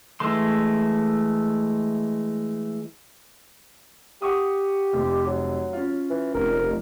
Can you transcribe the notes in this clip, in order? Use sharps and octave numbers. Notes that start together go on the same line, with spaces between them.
E3 G#3 A3 C6
G4 F#5 C#6 D#6
F1 F2
F#3
C#4 F4
E3
F1 A#4